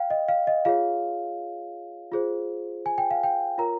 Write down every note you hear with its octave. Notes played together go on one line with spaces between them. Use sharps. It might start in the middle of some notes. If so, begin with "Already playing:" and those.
Already playing: F5 G5
D#5
F5
D#5
F4 G#4 C#5 F5
F4 G#4 C5
G#5
G5
F5
G5
F4 A#4 C#5 A#5